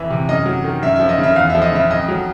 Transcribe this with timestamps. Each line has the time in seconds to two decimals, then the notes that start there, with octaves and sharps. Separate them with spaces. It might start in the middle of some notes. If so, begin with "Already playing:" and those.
Already playing: F2 E3 E5
0.10 C3
0.29 F#2 D#5
0.46 F#3
0.64 D#3
0.82 F#2 E5
0.96 F3 E5
1.09 D#5
1.18 C#3
1.23 E5
1.36 E2 F5
1.50 F3 E5
1.62 D#5
1.72 C#3 E5
1.90 F2 D#5
2.08 F#3